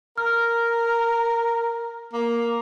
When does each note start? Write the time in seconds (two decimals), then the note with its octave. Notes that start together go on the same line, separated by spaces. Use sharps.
0.18 A#4 F6
2.13 A#3